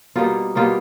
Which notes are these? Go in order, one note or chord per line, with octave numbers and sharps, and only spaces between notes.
B2 G3 A#3 D#4 F4
B2 G3 A#3 D#4 F4